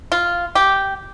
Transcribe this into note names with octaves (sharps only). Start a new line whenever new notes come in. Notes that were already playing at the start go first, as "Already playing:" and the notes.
F4
G4